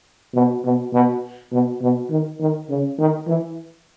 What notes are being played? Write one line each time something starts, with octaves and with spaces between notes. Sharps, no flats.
B2
B2
B2
B2
B2
D#3
D#3
C#3
D#3
E3